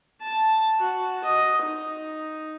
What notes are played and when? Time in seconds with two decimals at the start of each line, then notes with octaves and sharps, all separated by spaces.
0.22 A5
0.81 F#4
1.25 D#5
1.63 D#4